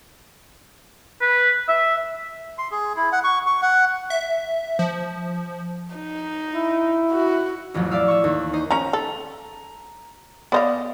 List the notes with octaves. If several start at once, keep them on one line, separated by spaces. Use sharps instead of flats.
B4
E5
C6
G#4
E4
F#5
C#6
C#6
F#5
E5
F3
D#4
E4
F#4
A1 F2 F3 F#3
D5 E5 F5 E6
C#6 E6
D#2
D#4 C5 D#5
F3 C#4 A#5
A4
B3 C5 D5 D#5 F5